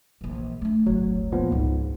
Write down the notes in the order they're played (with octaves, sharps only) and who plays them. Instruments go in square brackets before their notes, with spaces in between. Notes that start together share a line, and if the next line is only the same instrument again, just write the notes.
[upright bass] A#1 E3
A3 D4
[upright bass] D1 G1 [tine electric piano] F#3
[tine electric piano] A#2 F3 B3
[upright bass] C#2 [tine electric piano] G#2